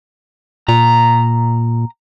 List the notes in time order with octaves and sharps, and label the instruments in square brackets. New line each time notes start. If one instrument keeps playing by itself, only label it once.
[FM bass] A#2 [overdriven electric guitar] A#5